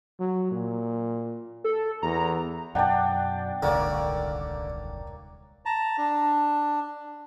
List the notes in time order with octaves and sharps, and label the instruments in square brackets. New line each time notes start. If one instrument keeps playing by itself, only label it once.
[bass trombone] F#3
A#2
[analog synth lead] A4
[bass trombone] E2 [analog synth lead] A#5
[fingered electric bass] F#2 B2 [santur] D4 D5 [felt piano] F#5 G5 A5
[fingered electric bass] D#1 C2 G#2 [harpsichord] D3 [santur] A#3 C#5 D5
[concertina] A5 A#5
D4